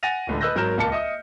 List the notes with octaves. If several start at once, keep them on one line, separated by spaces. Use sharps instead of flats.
F#5 G#5 A6 A#6 D#7 F7
D1 C#2 D3
B4 D#5 E6 F#6 G6 A#6
G#1 F#3 A#4 F6 G6 E7
D#1 C#2 A#3 A5 C#7
D#5 E5 D#6